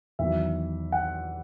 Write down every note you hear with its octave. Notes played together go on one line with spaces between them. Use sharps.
E2 D#3 F#3 E5
F#5